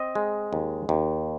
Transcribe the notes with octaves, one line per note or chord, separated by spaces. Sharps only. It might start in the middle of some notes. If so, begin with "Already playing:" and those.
Already playing: C4 D#5
G#3
D#2
D#2